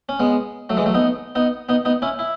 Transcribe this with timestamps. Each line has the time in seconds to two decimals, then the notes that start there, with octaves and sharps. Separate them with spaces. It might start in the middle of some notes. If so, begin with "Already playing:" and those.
0.09 C#4
0.20 G#3 B3
0.69 F#3 A3
0.77 E3 G#3
0.86 F#3 A3
0.94 B3 D#4
1.35 B3 D#4
1.69 B3 D#4
1.85 B3 D#4
2.02 C#4 E4
2.19 E4